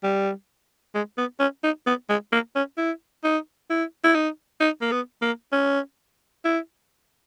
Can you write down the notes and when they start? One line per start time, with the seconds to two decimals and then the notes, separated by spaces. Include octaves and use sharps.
0.03 G3
0.95 G#3
1.18 B3
1.39 C#4
1.63 D#4
1.86 B3
2.09 G#3
2.32 A#3
2.55 C#4
2.77 E4
3.24 D#4
3.70 E4
4.04 E4
4.14 D#4
4.60 D#4
4.81 A#3
4.91 B3
5.22 A#3
5.52 C#4
6.45 E4